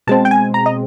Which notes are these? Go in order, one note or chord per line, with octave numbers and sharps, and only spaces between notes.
B2 G#3 C4 A5
G5
G#5
A#5
D#5